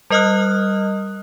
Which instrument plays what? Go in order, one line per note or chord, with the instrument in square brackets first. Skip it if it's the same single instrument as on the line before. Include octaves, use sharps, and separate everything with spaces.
[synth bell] G3 A#4 D#5 D#6 F6 F#6